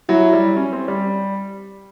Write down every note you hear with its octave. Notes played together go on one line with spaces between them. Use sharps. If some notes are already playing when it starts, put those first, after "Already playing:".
F#3 E4
G3
C#4
C4
G3